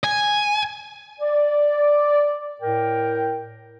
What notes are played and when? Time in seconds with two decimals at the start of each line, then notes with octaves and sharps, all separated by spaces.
0.04 G#5
1.20 D5
2.62 A2 A#4 G5